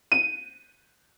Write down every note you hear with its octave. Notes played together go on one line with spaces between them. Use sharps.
D#7